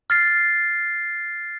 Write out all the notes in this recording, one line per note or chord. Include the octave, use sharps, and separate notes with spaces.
F6 A6 C7